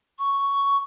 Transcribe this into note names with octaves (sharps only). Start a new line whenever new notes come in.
C#6